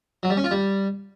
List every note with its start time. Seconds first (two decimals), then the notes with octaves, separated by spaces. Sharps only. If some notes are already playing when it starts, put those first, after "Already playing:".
0.23 F#3
0.30 G3
0.37 C#4
0.44 F4
0.51 G3